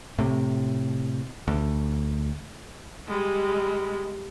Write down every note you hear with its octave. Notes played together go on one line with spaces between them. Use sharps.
A2 C3
D2
G3 G#3